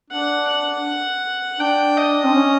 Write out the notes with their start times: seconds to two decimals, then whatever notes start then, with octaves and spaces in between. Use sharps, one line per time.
0.10 D4 F#5
0.48 F#5
1.59 D4 G5
1.97 D#5
2.24 C4
2.34 C#4